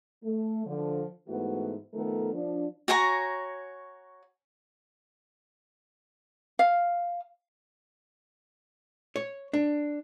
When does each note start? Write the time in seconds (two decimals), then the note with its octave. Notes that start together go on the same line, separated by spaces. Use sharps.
0.24 A3
0.67 D3 F3
1.28 G#2 E3 A3 B3 E4 F#4
1.94 D#3 F3 A3 B3 A4 A#4
2.33 F3 D4
2.88 F#4 C#5 G#5 A#5
6.59 F5
9.16 C#5
9.53 D4